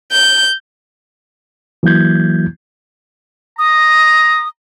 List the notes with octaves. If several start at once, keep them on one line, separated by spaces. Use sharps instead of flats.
G6
E3 F#3 A#3 E4 G6 G#6
A#5 D#6